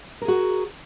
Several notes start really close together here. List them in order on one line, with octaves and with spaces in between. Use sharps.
A#4 G#4 F#4